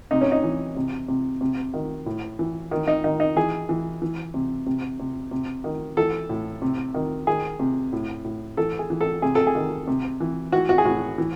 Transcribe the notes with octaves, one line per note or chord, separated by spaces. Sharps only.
C3 D#4
C#4
D#4
E3
C3
C3
C3
D#3
A2
E3
D#3
D#4
D#3 D#4
D#4
E3 G#4
E3
E3
C3
C3
C3
C3
D#3
E3 A4
A2
C3
D#3
D#3 G#4
C3
A2
A2
E3 A4
G#4
E3
A4
C3 G#4
A4
G#4
D#3
C3
E3
E3 F#4
F#4
G#4
A2 F#4
E3